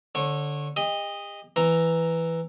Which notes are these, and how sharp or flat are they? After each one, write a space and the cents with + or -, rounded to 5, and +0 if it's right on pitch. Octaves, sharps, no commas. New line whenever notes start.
D3 +0 C#5 -25
G4 +45 D#5 +0
E3 +0 A#5 +0